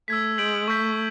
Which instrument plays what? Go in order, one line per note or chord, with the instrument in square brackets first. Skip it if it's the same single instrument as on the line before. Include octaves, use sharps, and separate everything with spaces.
[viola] A3 [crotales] E6 G#6 B6
[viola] G#3 [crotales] G6 B6 D7 F#7
[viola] A3 [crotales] C#6 E6 G6 B6